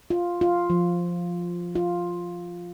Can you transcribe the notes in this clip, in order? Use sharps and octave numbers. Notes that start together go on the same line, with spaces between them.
F4
F4
F3
F4